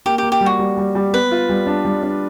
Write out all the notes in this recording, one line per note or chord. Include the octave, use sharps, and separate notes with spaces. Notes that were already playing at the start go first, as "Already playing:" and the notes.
A#3 G4
G4
A#3
G4
G3
F#4
G3
G3
G3
B3 B4
F4
G3
D4
G3
D4